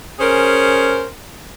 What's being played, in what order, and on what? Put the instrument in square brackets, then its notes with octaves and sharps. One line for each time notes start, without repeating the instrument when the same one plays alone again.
[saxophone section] C#4 G#4 A#4 C5